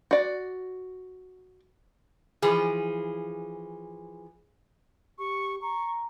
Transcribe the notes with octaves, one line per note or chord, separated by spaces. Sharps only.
F#4 D5
E3 F3 G#4
G4 C#6
A#5 C#6